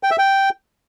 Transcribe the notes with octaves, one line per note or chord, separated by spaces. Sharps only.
G5
E5
G5